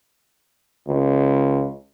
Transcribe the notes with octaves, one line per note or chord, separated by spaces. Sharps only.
C#2